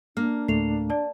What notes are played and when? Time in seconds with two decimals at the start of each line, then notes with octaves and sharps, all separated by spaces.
0.17 A#3 D4 F6
0.48 D2 A2 A3 C7 F7
0.90 D5 A5